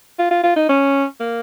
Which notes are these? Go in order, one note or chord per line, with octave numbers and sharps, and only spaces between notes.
F4
F4
F4
D#4
C#4
A#3